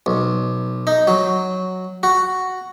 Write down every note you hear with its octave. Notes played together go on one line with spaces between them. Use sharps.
B1
D#4
F#3
F#4